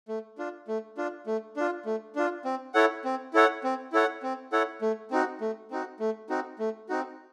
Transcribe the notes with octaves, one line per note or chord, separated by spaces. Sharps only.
A3
D4 F4
A3
D4 F4
A3
D4 F4
A3
D4 F4
C4
E4 A4 C#5 F#5
C4
E4 A4 C#5 F#5
C4
E4 A4 C#5 F#5
C4
E4 A4 C#5 F#5
A3
C4 D#4 F#4
A3
C4 D#4 F#4
A3
C4 D#4 F#4
A3
C4 D#4 F#4